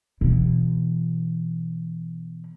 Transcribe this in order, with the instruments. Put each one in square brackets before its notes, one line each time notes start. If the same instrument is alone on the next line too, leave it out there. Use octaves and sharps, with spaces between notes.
[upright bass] B2 E3